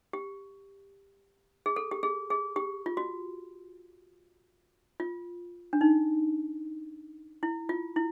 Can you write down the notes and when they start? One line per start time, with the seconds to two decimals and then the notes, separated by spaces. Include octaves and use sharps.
0.13 G4
1.66 G#4
1.76 A4
1.91 G4
2.03 G#4
2.30 G#4
2.56 G4
2.86 F4
2.97 F#4
5.00 F4
5.73 D4
5.81 D#4
7.43 E4
7.69 F4
7.96 E4